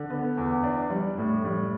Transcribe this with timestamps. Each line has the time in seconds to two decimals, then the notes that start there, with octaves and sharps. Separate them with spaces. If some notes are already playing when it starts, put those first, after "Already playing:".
Already playing: D3
0.10 B3
0.37 E2
0.63 D4
0.90 G3
1.18 A2
1.45 G3